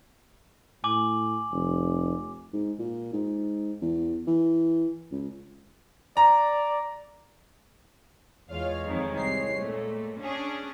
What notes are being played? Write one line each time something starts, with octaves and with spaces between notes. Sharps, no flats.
A2 G#5 D6 F#7
F1
G#2
A#2
G#2
E2
E3
C#2
D5 A#5
E2 G#3 F4 C#5 F5
F2 D#3
C2 C7
A#2 A3
C#4 D4 G#4